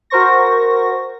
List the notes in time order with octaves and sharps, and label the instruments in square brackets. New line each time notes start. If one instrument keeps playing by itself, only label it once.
[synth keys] F#4 A#4 C5 C#6 A#6